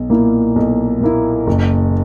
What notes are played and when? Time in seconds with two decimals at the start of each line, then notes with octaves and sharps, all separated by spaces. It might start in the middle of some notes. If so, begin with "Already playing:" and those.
Already playing: B1
0.10 A#2 A#3 E4
0.56 B1
1.01 A#2 A#3 E4
1.47 F#1